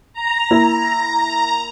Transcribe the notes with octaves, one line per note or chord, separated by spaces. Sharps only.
A#5
A#3 E4